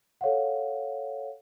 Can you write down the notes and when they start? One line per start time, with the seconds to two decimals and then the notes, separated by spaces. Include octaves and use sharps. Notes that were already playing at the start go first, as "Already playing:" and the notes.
0.21 A4 C#5 F5 F#5